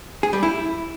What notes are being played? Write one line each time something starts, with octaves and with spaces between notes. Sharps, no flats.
G#4
G3
E4